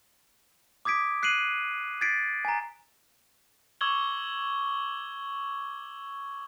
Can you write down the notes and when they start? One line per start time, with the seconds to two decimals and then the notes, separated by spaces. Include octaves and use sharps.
0.85 D6 D#6 G#6 B6 D7
1.23 F#6 C7 D7 D#7 F#7
2.01 G#6 A6 B6 C7 D7
2.45 G#5 A#5
3.81 C#6 D6 E6 G#6 F#7 G7